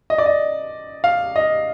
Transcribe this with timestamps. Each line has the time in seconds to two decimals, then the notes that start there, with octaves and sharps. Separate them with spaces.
0.10 D#5
0.18 D5
0.26 D#5
1.04 F5
1.36 D#5